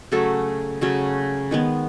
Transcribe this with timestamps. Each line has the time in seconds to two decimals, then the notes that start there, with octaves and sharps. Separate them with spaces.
0.12 C#3 F#3 A3 A4
0.81 C#3 F#3 A3
1.51 D#3 G#3 B3